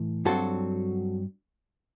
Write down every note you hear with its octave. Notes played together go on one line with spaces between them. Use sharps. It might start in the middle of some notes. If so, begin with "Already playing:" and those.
Already playing: A2 E3 A3
G2 F#3 C4 F#4 A4